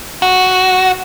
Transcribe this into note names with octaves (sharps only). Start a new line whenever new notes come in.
F#4